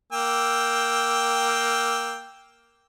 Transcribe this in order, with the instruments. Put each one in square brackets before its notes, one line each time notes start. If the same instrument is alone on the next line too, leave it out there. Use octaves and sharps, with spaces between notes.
[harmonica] A#3 G5 E6